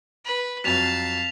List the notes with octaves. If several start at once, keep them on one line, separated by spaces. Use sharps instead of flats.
B4
F2 F#3 F5 A5 B6 F7